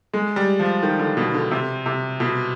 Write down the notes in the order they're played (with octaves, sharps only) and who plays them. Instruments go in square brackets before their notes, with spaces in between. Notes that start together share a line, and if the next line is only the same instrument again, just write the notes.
[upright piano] G#3
G3
F3
D#3
D3
B2
D3
C3
C3
B2